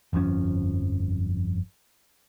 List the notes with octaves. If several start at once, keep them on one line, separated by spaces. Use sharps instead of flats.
G1 F2 F3 C#4